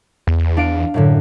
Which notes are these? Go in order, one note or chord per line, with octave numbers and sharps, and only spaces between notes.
E2
D4 F5 D7
F#2 A2 D3